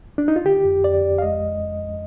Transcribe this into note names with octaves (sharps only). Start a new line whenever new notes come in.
D4
D#4
F4
D3 G4
F2
F2 D5
F2
F5
G#3 D#5